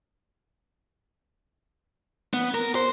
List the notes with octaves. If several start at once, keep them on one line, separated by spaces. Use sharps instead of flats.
B3
A#4
C5